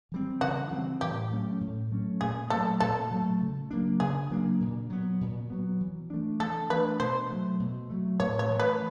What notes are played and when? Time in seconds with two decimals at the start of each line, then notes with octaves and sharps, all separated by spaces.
0.12 E3 G3 C4
0.41 C#3 F#4
0.71 E3 G3 C4
1.01 A2 G4
1.31 F#3 A3 C#4
1.61 A2
1.91 F#3 A3 C#4
2.21 A#2 G#4
2.50 F#3 A3 A4
2.80 A#2 A4
3.11 F#3 A3
3.41 C#3
3.71 F#3 A#3 D4
4.00 C#3 G#4
4.30 F#3 A#3 D4
4.60 A#2
4.90 F#3 B3
5.21 A#2
5.50 F#3 B3
5.81 E3
6.10 A3 D4
6.40 E3 A4
6.70 A3 D4 B4
6.99 B2 C5
7.30 F#3 A3
7.60 B2
7.90 F#3 A3
8.20 A2 C#5
8.39 C#5
8.50 E3 A3
8.60 B4